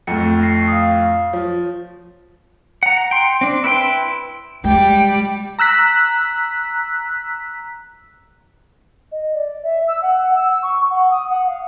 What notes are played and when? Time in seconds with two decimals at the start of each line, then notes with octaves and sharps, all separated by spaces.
0.07 F2 A2 C#7
0.41 C#6 A#6 C7
0.68 F5 D#6
1.33 F3 C#5
2.83 F#5 A#5
3.11 G5 C6
3.41 C4 D4
3.64 E4 B4 G5 C6
4.64 G3 G#3 G5
5.59 A#5 E6 F#6 B6
9.12 D#5
9.34 D5
9.63 E5
9.88 E6
10.02 F#5
10.35 E6
10.62 C#6
10.90 F#5
11.11 D#6
11.30 F#5
11.46 F5